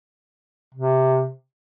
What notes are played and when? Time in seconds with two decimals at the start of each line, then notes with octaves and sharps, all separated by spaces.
0.74 C3